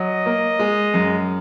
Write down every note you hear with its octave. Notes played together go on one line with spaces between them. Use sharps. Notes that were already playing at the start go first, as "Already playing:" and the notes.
Already playing: F#3 D#5
A#3
G#3
F#2